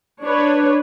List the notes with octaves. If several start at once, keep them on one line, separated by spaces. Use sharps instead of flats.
D4 B4 C#5